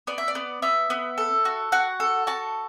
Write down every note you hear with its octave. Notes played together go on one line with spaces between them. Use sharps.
B3 D5
E5
D5
B3
B3 E5
B3
A4
F#4
F#4 F#5
A4
F#4 A5